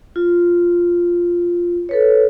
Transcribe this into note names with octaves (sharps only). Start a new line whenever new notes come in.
F4
A4 B4 C#5